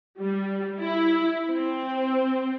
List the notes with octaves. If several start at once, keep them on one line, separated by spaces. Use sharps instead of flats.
G3
E4
C4